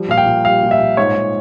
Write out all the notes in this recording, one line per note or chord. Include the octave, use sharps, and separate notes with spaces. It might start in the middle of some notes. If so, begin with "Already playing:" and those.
Already playing: F3 G3
A#2 F5
G5
A#2
G3 F5
A#2
E5
A#2
G#2 C#5
G#2